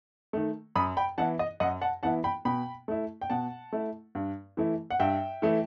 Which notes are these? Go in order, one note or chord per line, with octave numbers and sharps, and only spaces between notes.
D#3 A3
F#2 B5 D#6
G5 B5
E3 B3 E4 F#5 A5
D#5
F#2 D#5 F#5
F#5 A5
E3 B3 E4 F#5 A5
G5 B5
B2 G5 B5
A3 E4
G5
B2 F#5 A5
A3 E4
G2
E3 A3 E4
F#5
G2 E5 G5
E3 A3 E4